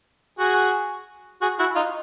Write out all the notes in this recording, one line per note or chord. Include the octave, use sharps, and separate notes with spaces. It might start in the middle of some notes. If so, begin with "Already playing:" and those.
F#4 G#4
F#4 G#4
E4 F#4
D#4 F4